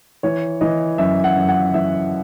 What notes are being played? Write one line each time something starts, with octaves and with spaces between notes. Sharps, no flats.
E3 C#5
E3 D#5
F#2 E5
F#5
F#2
F#5
E3 E5